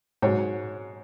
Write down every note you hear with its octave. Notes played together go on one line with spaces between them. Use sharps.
G#2 F#3 C#5